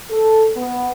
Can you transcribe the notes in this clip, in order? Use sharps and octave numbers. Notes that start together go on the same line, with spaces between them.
A4
B3